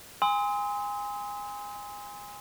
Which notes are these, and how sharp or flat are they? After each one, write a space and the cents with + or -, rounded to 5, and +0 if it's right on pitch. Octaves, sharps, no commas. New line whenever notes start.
G#5 -25 C6 -15 D#6 +45